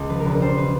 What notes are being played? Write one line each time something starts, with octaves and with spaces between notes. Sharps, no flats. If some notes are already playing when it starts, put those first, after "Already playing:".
Already playing: C#2
F3 B4
A#4
E1 B4
G3 C5
B4